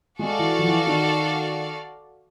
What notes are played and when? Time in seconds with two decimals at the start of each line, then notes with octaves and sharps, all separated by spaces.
0.19 G#3 F#4 A4 D5 F5
0.39 E3
0.59 F3
0.68 E3
0.87 D#3